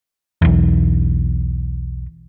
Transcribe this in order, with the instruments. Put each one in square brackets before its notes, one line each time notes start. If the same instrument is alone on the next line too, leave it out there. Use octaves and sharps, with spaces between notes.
[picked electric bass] B1 E2